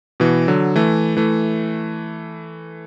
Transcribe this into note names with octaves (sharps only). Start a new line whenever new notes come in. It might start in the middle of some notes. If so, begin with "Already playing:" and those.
B2 E3
D3 F#3
E3 A3
E3 A3